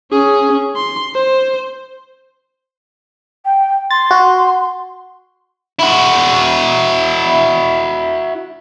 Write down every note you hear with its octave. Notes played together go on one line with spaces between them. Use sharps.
C#4 G#4
C6
C5
G5
C6 A6
F#4
E4 F#4